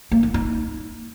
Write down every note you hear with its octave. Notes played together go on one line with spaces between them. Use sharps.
A#3
D#4
D#4